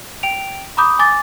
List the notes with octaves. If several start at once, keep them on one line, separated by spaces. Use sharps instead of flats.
G5 D7 F7
A#5 B5 D6 D#6 G6
G#5 D6 A6